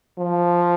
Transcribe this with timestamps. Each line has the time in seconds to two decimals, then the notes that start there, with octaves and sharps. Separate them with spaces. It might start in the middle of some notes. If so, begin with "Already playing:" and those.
0.18 F3